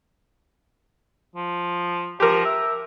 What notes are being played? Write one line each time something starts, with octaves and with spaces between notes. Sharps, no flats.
F3
F3 G4 A#4
E5